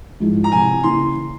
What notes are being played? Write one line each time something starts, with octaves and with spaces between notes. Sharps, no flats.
G#2 F3 G#3 E4
A#5
C3 F3 C4 E4 G#5
C#3 E3 A#3 E4 C6